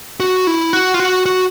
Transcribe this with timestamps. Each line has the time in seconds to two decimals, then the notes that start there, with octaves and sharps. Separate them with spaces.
0.20 F#4
0.47 E4
0.73 F#4
0.94 F4
1.00 F#4
1.26 F#4